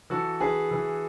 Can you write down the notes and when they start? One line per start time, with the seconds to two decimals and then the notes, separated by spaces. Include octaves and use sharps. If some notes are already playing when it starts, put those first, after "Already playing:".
0.10 E3 F#4 A4
0.40 E3 G#4 B4
0.71 E3